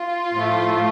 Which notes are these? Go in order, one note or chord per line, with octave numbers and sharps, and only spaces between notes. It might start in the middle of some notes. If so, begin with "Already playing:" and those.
Already playing: F4
A2 F3 A3